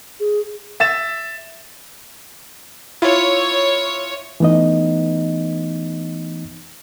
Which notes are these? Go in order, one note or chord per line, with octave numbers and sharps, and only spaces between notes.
G#4
E5 A6 E7
E4 F4 C#5
E3 A3 B3 D#4 D#5